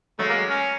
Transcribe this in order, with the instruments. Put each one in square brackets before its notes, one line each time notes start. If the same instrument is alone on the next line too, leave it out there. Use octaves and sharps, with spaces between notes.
[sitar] F#3 G#3 [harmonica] A3
[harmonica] A#3
C#4